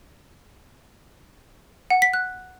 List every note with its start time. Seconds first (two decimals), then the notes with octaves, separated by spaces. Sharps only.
1.90 F#5
2.02 B6
2.14 F#6